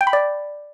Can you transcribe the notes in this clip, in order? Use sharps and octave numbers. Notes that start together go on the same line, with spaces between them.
G5
B5
D5